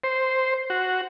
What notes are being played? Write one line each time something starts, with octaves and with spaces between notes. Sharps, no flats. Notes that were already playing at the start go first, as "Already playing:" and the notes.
C5
F#4